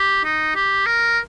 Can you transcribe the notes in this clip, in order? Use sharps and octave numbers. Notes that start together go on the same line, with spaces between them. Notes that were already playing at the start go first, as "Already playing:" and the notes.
Already playing: G4
D#4
G4
A#4